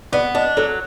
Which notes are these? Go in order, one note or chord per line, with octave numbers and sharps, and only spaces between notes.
B3 D5
D4 D#5
F#3 A4